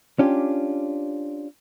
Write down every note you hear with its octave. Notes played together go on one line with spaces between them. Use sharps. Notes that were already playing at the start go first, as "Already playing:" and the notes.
C#4 D4 F4 G4